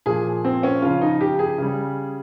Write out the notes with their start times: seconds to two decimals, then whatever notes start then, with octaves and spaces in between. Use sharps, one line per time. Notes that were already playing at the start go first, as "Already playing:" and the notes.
0.06 A#2 F3 G#4
0.45 C4
0.63 C#4
0.82 C#3 F3 F4
1.01 D#4
1.21 G4
1.39 G#4
1.58 C#3 G3